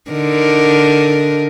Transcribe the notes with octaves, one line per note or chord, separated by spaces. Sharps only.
D3 D#4 A#4